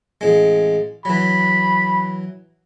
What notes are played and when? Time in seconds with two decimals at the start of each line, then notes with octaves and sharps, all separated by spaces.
0.21 A1 G#3
1.05 E3 F#3 B5